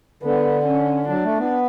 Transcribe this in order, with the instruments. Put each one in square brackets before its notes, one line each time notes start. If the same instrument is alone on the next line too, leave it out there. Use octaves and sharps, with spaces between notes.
[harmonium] D3 [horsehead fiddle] B3
[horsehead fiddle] C#4
[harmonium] F#3 [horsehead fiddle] D4
[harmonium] A3
B3